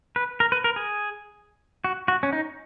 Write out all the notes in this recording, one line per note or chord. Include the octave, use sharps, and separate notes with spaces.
B4
A#4
B4
A#4
G#4
F#4
F#4
C#4
D#4